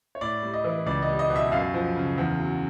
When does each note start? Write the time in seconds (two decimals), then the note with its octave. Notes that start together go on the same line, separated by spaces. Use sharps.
0.15 C#5
0.21 A2 D5
0.43 G3
0.54 D#5
0.64 E3
0.86 C#2 D5
1.02 D#5
1.08 G3
1.19 D#5
1.30 B2
1.36 E5
1.52 F#2 F5
1.74 F3
1.96 C#3
2.18 E2
2.39 F#3